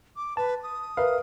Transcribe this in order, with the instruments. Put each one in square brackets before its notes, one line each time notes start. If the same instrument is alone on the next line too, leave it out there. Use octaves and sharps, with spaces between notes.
[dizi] D6
[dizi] B4 [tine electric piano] A5
[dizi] D#6
[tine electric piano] A#4 E5 F5 [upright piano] B4